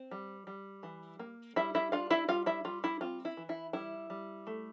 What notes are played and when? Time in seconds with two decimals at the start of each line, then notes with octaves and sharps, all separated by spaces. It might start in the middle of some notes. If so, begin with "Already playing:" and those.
Already playing: C4
0.11 G3
0.47 G3
0.83 E3
1.19 A#3
1.56 G3 E4 E5
1.75 E4 E5
1.92 D4 F4 F5
2.10 E4 E5
2.28 G3 F4 F5
2.46 E4 E5
2.65 G3 F4
2.84 E4
3.01 C4 F4
3.25 E4
3.37 E3
3.49 E4
3.73 G3 E4
4.10 G3
4.47 A3